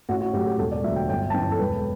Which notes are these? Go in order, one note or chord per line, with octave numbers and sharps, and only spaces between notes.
A1 F#4
F#4
A2 F#3 G4
G4
E1 A4
D5
D2 D3 F#3 E5
G5
G1 G5
A5
F#2 E3 G5
A4
E1 B4